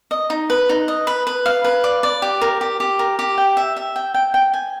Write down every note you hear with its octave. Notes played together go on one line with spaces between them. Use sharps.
D#5
D#4
B4
D#4
D#5
B4
B4
F5
B4
D5
D5
G4
A#4
G4
G4
A#4
G4
G5
E5
E5
G5
G5
G5
G#5